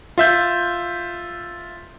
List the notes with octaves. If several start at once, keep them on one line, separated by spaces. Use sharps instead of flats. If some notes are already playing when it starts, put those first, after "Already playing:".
F4 E5 G6